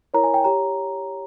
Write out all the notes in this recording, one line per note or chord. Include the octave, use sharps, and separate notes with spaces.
E4 A#4 C#5 A#5
G#5
G5
G4 C#5 A#5